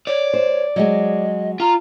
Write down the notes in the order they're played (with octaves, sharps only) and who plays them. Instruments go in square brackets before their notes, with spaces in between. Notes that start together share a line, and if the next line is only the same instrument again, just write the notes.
[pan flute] C#5 [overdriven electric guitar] D5
[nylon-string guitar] C5
[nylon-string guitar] F#3 G#3 [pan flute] D#5
[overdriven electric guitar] F4 [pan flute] A#5